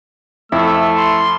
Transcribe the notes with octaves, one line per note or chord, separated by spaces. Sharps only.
F2 A3 E4 E6
C6